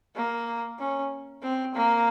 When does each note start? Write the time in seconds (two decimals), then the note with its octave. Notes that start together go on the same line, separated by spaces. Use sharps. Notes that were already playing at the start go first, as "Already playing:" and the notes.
0.15 A#3
0.79 C#4
1.42 C4
1.75 A#3